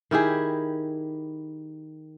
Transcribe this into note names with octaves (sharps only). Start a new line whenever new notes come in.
D#3 E4 G4 G#4